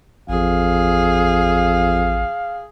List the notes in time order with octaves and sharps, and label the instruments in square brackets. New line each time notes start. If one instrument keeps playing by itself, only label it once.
[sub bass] A1 [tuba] F2 [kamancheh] G#4 [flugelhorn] F5